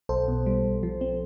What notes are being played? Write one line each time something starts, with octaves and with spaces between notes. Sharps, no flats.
B1 A4 C5
B2
G3
B1
F3
C4